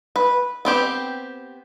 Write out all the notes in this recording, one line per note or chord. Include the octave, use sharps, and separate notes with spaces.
B4
B3 C4 G4